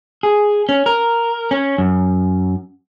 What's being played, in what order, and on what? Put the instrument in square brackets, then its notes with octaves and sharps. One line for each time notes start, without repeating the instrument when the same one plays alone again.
[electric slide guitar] G#4
C#4
A#4
C#4
F#2